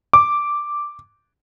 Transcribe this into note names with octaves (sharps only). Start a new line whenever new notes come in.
D6